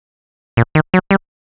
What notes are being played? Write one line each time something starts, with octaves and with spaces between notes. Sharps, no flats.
A#2
D#3
F#3
G3